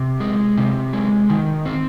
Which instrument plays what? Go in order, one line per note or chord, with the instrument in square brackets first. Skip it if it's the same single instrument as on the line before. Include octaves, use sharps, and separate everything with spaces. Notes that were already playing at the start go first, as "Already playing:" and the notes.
Already playing: [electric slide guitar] C3
G#3
C3
G#3
D#3
C4